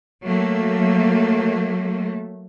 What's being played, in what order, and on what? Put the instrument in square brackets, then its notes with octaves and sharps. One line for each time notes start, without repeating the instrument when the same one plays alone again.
[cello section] F#3 A3 A#3